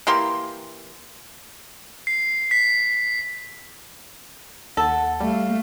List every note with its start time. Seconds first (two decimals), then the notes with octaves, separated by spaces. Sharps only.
0.07 E3 A#3 G4 C6
2.07 C7
2.51 B6
4.77 D#2 A4 F#5
5.20 G3 A3 F5